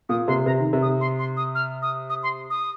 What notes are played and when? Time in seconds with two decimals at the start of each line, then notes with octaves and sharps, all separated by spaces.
0.09 A#2 D#6
0.28 C3 C6
0.46 C3 A#5
0.60 D#3
0.73 C3
0.82 D#6
1.01 C6
1.19 C6
1.37 D#6
1.55 F6
1.82 D#6
2.10 D#6
2.23 C6
2.50 D#6